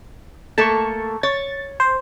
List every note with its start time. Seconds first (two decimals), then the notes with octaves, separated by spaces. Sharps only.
0.58 A3 A#3 A4 A5 C#6
1.23 C#5 A6
1.80 C5